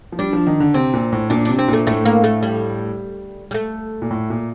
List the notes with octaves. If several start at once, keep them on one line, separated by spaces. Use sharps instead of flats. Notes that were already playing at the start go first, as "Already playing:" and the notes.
F3
G3 D4
F3
D#3
D3
C3 C4
A#2
A2
A#2 D4
C3 D4
C4
A#2 A3
A2 A3
A#3
A3
G3
G3
A3
A#2
A2
A#2